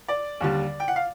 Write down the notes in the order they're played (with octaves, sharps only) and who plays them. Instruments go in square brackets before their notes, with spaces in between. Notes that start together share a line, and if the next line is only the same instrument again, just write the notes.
[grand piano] D5
D#2 D3 G3
G5
F#5
F5